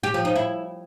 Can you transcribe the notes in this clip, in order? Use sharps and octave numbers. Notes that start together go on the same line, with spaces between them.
G4
F3
D#4
E4